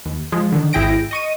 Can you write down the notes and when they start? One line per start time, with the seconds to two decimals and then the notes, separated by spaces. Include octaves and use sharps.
0.05 D#2
0.32 F3 G#3
0.52 D3 D#3
0.73 G#1 E4 G#4 G5 A#6 D7
1.11 D#5 C#6 D#7